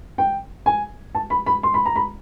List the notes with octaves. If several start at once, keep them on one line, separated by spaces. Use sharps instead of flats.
G5
G#5
A5
B5
B5
C6
B5
A#5
B5